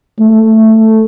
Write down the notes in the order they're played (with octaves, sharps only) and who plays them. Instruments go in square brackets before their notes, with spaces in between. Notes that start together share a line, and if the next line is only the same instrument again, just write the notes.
[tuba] A3